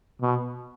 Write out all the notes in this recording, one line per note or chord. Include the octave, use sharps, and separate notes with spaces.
B2